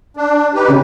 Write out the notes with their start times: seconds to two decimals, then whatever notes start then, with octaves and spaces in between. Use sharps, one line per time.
0.17 D4
0.54 D#4 G4 B4
0.68 C#3 C#4